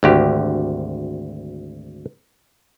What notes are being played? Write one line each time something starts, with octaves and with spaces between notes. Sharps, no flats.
G#1 D2 G4